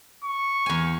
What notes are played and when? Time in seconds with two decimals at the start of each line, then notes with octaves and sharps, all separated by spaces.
0.24 C#6
0.66 E2 G#5